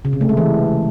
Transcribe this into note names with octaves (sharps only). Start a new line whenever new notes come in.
C#3
C3
A3
G#3
E3